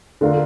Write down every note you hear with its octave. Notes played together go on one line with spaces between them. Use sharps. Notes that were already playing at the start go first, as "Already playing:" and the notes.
D3 A3 D4 F4 A#4